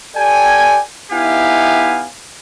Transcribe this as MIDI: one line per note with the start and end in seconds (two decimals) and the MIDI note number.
0.16 0.78 67
0.16 0.78 69
0.16 0.78 74
0.16 0.78 79
0.16 0.78 80
1.11 2.06 59
1.11 2.06 63
1.11 2.06 64
1.11 2.06 67
1.11 2.06 77
1.11 2.06 80